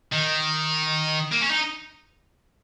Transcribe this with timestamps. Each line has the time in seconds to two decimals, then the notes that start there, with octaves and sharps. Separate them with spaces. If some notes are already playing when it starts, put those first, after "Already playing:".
0.13 D#3
1.32 A#3
1.41 C#4
1.50 D#4